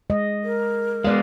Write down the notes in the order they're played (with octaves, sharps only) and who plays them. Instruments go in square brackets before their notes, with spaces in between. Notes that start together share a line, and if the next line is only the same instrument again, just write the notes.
[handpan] G#3 D#5
[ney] A#4
[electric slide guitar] G#3 B3 [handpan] D5 F5